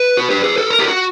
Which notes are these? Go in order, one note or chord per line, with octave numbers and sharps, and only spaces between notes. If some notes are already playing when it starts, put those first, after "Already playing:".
Already playing: B4
F#4
G4
G#4
A4
A#4
G4
F#4